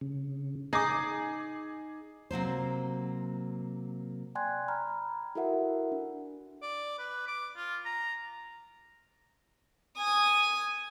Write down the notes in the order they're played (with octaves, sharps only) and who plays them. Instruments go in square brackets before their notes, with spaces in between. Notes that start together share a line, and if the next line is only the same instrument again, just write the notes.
[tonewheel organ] C#3
[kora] D#4 [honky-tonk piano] G#4 D6
[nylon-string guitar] C3 F#3 A#3 C5
[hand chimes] D5 G5 G#5 C6 F#6 G#6
A#5 B5 F6
E4 F#4 A4 A#4 E5 F#5
D4
[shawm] D5
B4
D6
F4
A#5
[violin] G#5 D#6